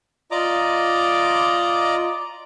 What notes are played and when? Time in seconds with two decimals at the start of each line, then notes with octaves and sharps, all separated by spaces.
0.31 F4 D5 D#5 A#5 D6